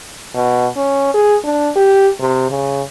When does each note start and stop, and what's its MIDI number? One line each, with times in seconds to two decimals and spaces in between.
0.35 0.67 47
0.76 1.12 61
1.14 1.36 68
1.44 1.70 62
1.76 2.08 67
2.21 2.45 48
2.50 2.82 49